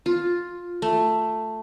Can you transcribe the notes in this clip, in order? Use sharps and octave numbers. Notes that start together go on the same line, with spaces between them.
F4
A3